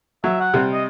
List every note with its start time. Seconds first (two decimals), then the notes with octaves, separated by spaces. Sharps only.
0.24 F#3 E5
0.40 F#5
0.54 C3 G3
0.72 D#5